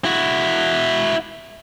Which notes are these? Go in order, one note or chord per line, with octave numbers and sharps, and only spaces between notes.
E4 F#4